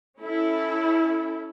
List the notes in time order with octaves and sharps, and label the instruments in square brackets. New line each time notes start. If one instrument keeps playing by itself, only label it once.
[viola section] C#4 E4 A4